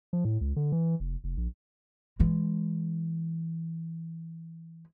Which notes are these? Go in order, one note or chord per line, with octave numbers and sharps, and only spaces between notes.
F3
A2
C#2
D3
E3
F1
F1
A#1
E3 G#3